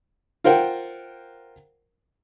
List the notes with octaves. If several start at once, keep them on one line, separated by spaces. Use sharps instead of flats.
F4 A#4 C5 F#5 G5